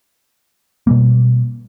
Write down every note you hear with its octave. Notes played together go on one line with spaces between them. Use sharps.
B2 G3 A#3